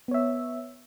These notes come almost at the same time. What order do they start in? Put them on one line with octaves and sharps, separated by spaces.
B3 C#5 E5